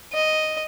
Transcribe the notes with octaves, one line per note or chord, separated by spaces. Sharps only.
D#5